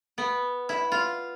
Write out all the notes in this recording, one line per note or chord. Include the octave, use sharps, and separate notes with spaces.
B3
E4
F4